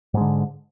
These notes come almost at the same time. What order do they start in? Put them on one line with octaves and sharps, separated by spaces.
G#2 G#3 D3